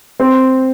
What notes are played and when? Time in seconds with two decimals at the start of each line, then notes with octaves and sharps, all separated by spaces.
0.20 C4